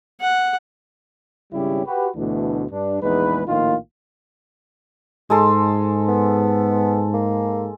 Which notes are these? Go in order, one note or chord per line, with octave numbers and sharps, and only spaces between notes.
F#5
G#1 C#3 G3 C#4 E4 G4
F#4 G4 B4
D2 B2 E3 A3 D4
G2 D4
A#1 E2 G#3 D#4 B4
A#1 A2 D#3 A#3 F4
G#2 G#3 A4 C6
B3
A#3